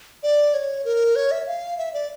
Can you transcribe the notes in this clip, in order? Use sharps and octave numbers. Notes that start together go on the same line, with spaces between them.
D5
C#5
A#4
C#5
E5
F5
E5
D5